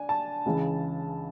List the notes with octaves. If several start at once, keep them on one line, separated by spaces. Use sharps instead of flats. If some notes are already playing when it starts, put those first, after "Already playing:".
Already playing: D4 G#5
A5
C#2 C#3 E3